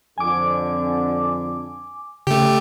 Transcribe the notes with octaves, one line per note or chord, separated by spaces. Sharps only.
F2 D3 G#5 D6
C#3 A3 G4